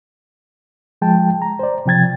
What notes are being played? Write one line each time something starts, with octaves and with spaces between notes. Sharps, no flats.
F3 G#3 G5 A5
A#5
C5 D5
C3 F3 G5 G#6 A6